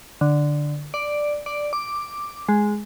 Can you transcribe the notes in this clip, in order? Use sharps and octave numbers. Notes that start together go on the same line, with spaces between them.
D3
D5
D5
D6
G#3